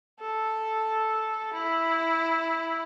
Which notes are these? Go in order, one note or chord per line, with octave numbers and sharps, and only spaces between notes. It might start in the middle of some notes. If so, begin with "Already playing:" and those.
A4
E4